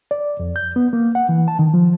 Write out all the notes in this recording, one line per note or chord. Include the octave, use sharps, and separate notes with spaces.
D5
F2
G6
B3
A#3
F#5
E3
A5
D#3
F3